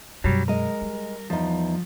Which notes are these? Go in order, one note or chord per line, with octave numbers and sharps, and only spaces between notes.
F#2 B2 F#3 G3
G#3 A#4 D#5
G3
E2 F3 D#4